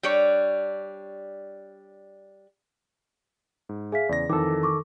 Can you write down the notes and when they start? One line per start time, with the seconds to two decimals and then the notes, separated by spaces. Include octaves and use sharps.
0.03 G3 D4 C#5
3.69 G#2
3.92 G#4 E5 F5 G#5 B6
4.09 E2 C#3 D5 A#6
4.29 F2 D#3 E3 A4 D6
4.63 C#6 D6